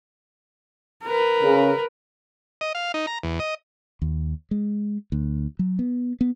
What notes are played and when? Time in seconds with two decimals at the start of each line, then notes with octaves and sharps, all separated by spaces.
1.04 A#4 B4
1.43 C#3
2.61 D#5
2.75 F5
2.94 D#4
3.07 A#5
3.24 E2
3.40 D#5
4.02 D#2
4.51 G#3
5.12 D2
5.59 F#3
5.79 B3
6.21 B3